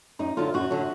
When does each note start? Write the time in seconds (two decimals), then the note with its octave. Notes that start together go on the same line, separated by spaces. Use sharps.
0.19 F#2 D#4
0.37 D3 F#3 F4
0.54 F#2 F#4
0.71 D3 F#3